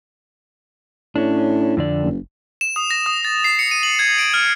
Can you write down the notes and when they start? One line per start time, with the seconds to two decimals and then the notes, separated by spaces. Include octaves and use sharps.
1.16 A2 C#4 D4
1.77 F2 D3 D5
2.03 F#1
2.61 E7
2.76 D#6
2.91 A#6
3.06 D#6
3.25 A6
3.44 C7
3.59 C#7
3.71 D#7
3.83 F#7
3.99 G#6
4.18 D7
4.34 F6